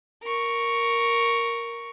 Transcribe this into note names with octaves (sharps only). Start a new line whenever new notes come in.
A#4 C#6